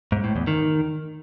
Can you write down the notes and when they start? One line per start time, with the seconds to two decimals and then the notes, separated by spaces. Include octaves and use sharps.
0.12 G#2
0.24 A2
0.36 E2
0.47 D#3